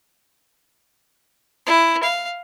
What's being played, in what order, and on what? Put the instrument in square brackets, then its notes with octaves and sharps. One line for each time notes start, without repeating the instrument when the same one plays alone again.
[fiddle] E4
F5